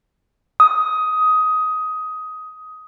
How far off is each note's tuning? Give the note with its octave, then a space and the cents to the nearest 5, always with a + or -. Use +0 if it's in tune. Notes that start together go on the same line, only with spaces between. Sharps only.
D#6 +15